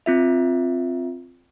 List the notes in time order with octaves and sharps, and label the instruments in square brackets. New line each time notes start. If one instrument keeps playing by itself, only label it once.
[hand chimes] C4 F4 E5